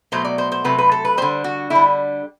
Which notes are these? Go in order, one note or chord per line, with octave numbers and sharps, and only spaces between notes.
B2 F#3 A3 C5
D5
C5
C5
C3 F#3 A3 B4
B4
A4
B4
D3 G3 C5
F#4
D3 G3 E4